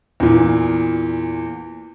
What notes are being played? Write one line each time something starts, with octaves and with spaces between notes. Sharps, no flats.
E2 A#2